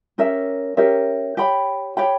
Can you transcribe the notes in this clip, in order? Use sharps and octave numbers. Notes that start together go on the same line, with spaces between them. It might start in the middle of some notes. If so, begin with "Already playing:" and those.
C#4 G4 A#4 E5
C#4 G4 A#4 E5
G4 C#5 G5 B5
G4 C#5 G5 B5